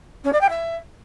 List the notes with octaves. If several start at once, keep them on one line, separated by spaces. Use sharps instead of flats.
C#4
D5
G5
E5